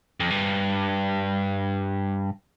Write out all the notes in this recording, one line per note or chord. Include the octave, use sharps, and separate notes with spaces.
F2
G2